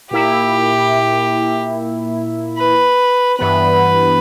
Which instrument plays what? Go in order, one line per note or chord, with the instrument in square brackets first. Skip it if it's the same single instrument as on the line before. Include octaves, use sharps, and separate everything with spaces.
[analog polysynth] A#2 A#3 E4 [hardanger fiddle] G4
[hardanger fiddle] B4
[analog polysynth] G2 E3 B3 [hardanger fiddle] B4